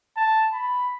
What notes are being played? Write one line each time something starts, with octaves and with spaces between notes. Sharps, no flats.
A5
B5